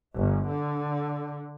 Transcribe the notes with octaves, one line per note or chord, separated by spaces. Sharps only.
G1
D3